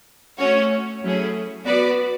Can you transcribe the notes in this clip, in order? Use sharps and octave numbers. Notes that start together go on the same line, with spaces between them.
A3 C#4 F#4 C#5
F#3 A3 C#4 E4 G#4
B3 F#4 B4 D5